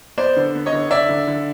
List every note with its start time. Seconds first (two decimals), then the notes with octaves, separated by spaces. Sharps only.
0.18 B3 C5 D5
0.37 D3
0.55 B3
0.66 C#5 D#5
0.73 D3
0.90 D3 D5 E5
1.09 D3
1.27 D3